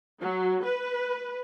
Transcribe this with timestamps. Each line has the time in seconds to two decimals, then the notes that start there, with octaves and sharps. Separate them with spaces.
0.21 F#3
0.64 B4